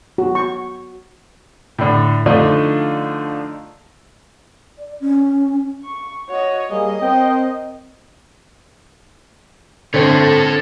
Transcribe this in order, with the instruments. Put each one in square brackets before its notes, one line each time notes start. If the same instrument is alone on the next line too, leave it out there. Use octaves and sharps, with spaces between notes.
[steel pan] F#4
C#6
[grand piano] A2 D3
D3 F3 A3 D4 D#4 F4
[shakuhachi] D5
C#4
[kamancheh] C#6
[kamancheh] F#4 D#5 [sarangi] C#5
[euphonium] G3 [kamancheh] A#3 [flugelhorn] G#4 [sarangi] D#5
[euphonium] C4 [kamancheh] A#4 C5 [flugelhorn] G5
[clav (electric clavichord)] D3 C4 [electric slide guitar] A4 C#5